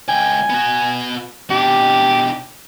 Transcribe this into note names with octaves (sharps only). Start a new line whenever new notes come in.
C#2 G5 G#5
B3 F#4
B2 D4 G4